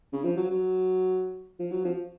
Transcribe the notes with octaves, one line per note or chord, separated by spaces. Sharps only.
C#3
F3
F#3
F#3
F3
F#3
F3